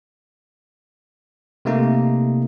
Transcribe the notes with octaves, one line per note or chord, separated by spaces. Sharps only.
C3 A3 A#3 D#4